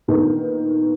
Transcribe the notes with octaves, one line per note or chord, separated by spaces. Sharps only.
A#2 D3 D#3 B3 D#4